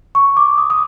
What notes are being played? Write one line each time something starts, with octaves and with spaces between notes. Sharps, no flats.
C#6
D6
D#6
D#6